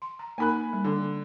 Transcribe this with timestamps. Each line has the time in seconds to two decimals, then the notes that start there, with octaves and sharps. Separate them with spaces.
0.02 C6
0.19 A#5
0.38 A#3 D#4 A#4 G#5 B5 F#6
0.73 G3
0.84 D3